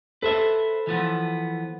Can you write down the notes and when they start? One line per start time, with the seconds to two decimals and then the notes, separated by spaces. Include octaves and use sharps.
0.22 A4 B4 C5 E5
0.87 E3 F3 B3